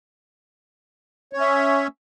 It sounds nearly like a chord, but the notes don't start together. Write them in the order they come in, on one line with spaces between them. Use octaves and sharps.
C#5 C#4 E5